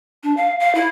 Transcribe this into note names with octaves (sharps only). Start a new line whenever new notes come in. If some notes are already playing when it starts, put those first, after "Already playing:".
D4
F5
F5
E4